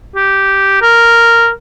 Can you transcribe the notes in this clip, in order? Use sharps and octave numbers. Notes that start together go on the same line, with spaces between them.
G4
A#4